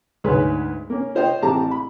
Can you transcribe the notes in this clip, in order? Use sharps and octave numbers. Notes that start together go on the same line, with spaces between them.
D2 G#2 G#3 G#4 B4 C#5
A#3 C#4
F4 C5 C#5 D#5 G5
A1 G#3 C4 G4 A5 A#5
B5